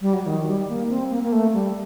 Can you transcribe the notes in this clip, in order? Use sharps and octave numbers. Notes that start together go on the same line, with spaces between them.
G3
F#3
D#3
G3
A#3
C4
A#3
A#3
A3
G3